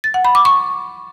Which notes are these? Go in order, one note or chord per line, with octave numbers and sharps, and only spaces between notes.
A6
F#5
B5
D6
C#6